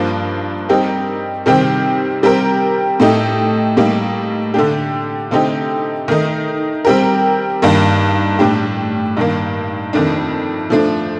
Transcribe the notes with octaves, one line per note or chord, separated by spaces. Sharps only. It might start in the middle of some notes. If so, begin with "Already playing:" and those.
Already playing: G2 F3 A#3 D4
G3 C4 D#4 G4 A#4
C3 D#3 G3 C4 G4
G3 C4 G4 A#4
A2 A3 D#4 G4
A2 G3 A#3 D#4
D3 A3 D4 G4
D3 A3 C4 D#4 G4
D#3 A3 D#4
G3 C4 G4 A#4
G2 D#3 A#3
A2 G3 D4 G4
G2 D#3 A#3
F2 D#3 A3 D4
F3 A3 D4